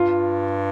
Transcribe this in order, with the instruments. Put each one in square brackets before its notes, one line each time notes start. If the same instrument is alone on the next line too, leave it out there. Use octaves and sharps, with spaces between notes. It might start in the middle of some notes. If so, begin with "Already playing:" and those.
Already playing: [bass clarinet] G2 [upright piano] F4